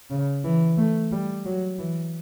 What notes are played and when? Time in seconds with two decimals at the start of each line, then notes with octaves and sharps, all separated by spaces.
0.10 C#3
0.44 E3
0.78 A3
1.12 G3
1.45 F#3
1.79 E3